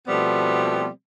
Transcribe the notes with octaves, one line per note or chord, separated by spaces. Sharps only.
B2 F3 G3 A3 B3 C4